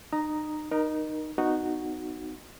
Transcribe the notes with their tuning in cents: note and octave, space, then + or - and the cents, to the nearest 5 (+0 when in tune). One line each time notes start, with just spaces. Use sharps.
D#4 -35 A#5 +0 D#6 +0
D#4 -15 A#4 +20
B3 +30 D#4 -10 F#4 +0